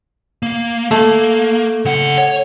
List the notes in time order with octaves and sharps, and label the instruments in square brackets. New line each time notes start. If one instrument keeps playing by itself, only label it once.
[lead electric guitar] A#3
[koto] A3 [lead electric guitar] A#3
[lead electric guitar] C#3 F#5
C#5